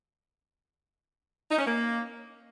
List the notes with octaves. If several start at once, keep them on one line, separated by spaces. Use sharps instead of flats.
D#4
C#4
A#3